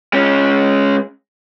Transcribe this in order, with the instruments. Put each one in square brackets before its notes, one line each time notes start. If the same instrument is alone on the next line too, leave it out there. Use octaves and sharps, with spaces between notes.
[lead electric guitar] G#3 C#4